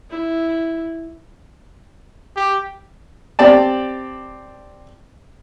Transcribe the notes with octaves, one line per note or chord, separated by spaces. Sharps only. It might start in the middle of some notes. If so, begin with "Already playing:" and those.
E4
G4
C4 G4 D5 A5